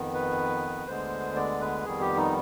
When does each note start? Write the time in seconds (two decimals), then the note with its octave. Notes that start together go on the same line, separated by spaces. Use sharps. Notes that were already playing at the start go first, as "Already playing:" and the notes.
Already playing: F2 D#3 B3
0.14 B4
0.87 D2 D3 G#3 B3 C5
1.36 D5
1.60 B4
1.84 F2 D#3 G3 B3 G#4
2.01 G4
2.17 D#4